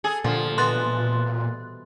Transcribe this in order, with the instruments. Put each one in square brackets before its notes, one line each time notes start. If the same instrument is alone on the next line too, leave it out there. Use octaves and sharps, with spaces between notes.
[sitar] G#4 [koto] A4
[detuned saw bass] A#2 [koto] D3 G3 F4 [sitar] F3
[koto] B2 E3 B3 [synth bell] C6 F#6 A6